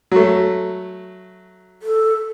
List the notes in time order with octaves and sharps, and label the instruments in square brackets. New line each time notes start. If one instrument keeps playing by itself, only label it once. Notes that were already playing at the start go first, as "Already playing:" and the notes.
[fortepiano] F#3 A3
[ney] A4